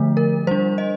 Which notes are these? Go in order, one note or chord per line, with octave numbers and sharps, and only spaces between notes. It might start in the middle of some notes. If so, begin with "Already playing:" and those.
Already playing: D3 F3 A3
A#4
G3 D4 C5
D#5